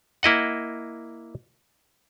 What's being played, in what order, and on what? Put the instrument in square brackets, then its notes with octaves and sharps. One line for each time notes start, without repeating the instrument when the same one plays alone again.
[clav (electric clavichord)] A#3 E4 D#5 F#5